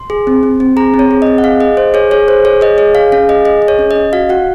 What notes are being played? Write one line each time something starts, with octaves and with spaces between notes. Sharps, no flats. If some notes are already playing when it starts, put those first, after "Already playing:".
Already playing: C6
G#4
C4
C4
C4
G#4 A#5
C4
C#5
G#4
C4 D#5
F#5
G#4 F5
G#4 D#5
G#4 C5
G#4 C#5
G#4 C#5
G#4 C5
G#4 C#5
G#4 D#5
G#4 C#5
G#4 F5
C#4 F5
G#4 D#5
G#4 D#5
G#4
C#5
C#4
D#5
C#4
F#4 F5
F#4 F#5